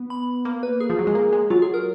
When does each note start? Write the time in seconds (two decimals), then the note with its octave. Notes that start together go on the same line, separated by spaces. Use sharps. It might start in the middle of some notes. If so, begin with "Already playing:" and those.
Already playing: B3
0.10 B5
0.45 A#3
0.63 B4
0.80 G#4
0.90 F3
0.99 F#3
1.07 G#3
1.15 A#3
1.33 G#3
1.50 F#3 F4
1.62 G#4
1.74 A#4